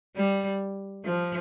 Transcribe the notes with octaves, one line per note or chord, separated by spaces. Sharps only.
G3
F3